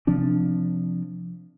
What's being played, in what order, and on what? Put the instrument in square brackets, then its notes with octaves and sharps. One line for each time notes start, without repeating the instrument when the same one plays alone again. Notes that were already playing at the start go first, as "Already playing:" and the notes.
[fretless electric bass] C3 F3 C4 D4